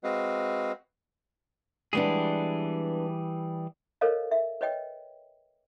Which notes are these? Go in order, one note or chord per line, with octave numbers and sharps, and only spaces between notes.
G#3 C4 F#4 B4 D#5 F5
E3 G3 G#3 B3 D4 G#4
A4 A#4 C5 C#5 D#5 F5
E5
B4 C#5 D#5 G5